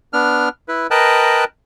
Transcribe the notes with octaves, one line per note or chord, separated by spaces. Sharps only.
B3 D4 F6
E4 B4
A#4 B4 D#5 G5 A5 F#6